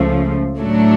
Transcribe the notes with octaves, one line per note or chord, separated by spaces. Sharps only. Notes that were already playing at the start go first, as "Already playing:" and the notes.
Already playing: C#2 C#3 F3 A3
A2 F#3 A3 D4